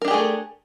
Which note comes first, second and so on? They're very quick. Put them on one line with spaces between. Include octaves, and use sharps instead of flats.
A#4 D4 G4 G#4 A3